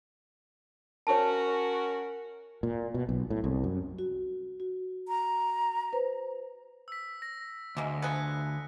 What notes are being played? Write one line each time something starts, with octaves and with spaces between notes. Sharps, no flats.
C#4 F#4 A#4 C#5 A5
A#2
B2
B1
A2
C2
F#2
F#4
F#4
A#5
B4 C5
E6 B6
A#6
D2 G#3 A#3
F3 G#4 B4 F#6 C#7